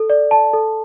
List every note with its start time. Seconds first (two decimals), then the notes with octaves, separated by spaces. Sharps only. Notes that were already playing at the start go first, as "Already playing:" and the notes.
Already playing: A4
0.10 D5
0.31 A5
0.53 A4